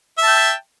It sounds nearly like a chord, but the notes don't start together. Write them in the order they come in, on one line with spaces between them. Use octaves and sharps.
E5 A5 G5